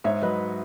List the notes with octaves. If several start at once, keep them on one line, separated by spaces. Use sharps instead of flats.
G#2 C#5 E5
F#3 B4 D#5